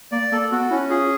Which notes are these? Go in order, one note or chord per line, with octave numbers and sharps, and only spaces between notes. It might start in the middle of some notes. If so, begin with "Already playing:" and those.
A#3 D5
A#3 A4
B3 F#4
C#4 E4
F4 G#4